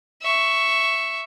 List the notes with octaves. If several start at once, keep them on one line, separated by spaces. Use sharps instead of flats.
E5 C#6